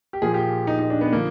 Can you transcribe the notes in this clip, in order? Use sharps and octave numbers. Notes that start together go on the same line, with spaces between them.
G4
A#2 F3 G#4
G4
D#4
D#4
D4
B3
D3 F3 A#3